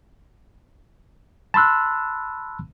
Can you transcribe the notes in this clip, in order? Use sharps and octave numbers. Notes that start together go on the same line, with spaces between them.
A5 B5 C6 E6 F#6